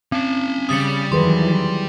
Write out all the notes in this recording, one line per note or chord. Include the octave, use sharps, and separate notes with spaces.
C4 C#4 A5
C#3 G3 D#6 A6 C#7
E2 D#3 E3 F#3 G#4 B4 C6